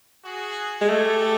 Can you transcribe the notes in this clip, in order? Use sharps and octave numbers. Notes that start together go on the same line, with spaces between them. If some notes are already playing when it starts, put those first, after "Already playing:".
F#4 G#4
G#3
A3 G4 A4